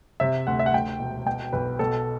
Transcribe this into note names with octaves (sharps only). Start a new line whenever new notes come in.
C3 E5
D2 F#5
E5
F#5
D2 G5
E1
B2 G5
B1 B4
B2 A4